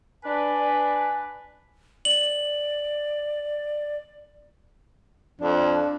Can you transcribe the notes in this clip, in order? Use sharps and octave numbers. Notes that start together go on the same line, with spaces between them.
D4 B4 G#5
D5 F#7
F2 D4